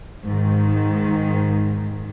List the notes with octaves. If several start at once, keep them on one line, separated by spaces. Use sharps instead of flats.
G#2 D#3